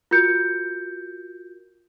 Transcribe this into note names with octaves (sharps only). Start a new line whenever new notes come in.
F4 F#4 A#4 G6 C#7